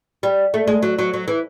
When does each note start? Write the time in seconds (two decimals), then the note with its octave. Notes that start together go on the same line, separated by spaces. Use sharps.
0.23 G3
0.54 A3
0.67 G#3
0.83 F#3
0.99 F#3
1.14 F#3
1.28 E3